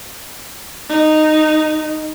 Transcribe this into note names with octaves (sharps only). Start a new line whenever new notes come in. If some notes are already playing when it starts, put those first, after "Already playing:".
D#4